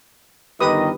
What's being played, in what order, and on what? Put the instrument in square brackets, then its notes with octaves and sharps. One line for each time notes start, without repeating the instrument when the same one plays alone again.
[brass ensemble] G1 D#3 D#5 [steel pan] G4 B4 D#6